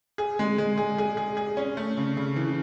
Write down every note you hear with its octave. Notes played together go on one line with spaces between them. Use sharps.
G#4
G#3
G#3
G#4
G#4
G#4
G#4
C#4
A3
C#3
C#3
E3